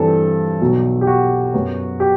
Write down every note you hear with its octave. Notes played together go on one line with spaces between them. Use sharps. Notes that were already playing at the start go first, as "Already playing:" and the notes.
Already playing: G2 E3 G3 C4 A4
B1 B2 F#3
G4
F#4
F#2 F#3 B3
G4